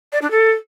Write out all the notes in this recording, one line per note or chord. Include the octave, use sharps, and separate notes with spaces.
D5
D4
A4